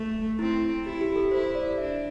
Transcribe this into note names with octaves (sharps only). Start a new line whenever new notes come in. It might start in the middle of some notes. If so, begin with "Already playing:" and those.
Already playing: A3
C4 E4
E4 G4
G4
A4
E4 C5
D5
D4 E5